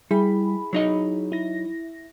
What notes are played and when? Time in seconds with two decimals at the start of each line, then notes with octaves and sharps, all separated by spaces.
0.11 G3 E4 G#4 B5
0.73 F#3 D#4 D#5
1.32 E4 A#6